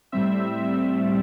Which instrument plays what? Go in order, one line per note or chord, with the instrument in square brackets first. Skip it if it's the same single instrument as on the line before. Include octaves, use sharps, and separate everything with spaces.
[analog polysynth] A2 G3 C4 E5